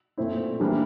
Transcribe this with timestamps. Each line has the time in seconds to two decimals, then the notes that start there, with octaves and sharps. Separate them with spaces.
0.18 A#2 A3 C4 E4
0.60 E3 G3 A#3 D4